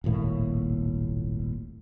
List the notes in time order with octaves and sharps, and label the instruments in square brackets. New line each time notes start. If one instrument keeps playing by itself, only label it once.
[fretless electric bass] D#1 G#1 A2 A#3